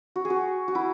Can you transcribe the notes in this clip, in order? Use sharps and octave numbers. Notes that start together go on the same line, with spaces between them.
F#4
G#4
F#4
F#4
E4